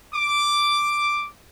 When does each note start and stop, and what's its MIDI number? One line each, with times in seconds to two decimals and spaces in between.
0.13 1.27 86